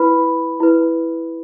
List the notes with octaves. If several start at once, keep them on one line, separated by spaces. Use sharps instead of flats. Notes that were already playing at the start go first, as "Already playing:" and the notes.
Already playing: E4 B4 B5
E4 B4